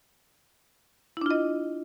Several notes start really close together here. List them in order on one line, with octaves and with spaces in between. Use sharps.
E4 D4 F4 D#5